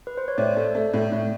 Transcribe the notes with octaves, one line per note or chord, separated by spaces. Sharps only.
B4
C5
C#5
A2 D5
A3
A3
A2
A2